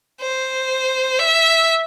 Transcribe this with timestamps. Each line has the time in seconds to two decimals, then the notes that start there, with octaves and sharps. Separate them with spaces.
0.21 C5
1.19 E5